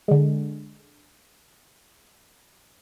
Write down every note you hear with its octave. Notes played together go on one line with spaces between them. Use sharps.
D3 G#3